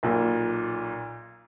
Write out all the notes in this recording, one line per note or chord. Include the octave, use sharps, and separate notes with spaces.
B1 A#2